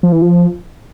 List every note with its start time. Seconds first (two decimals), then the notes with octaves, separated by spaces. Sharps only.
0.03 F3
0.12 E3
0.22 F3